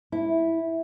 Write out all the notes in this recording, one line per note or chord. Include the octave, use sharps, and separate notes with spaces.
E4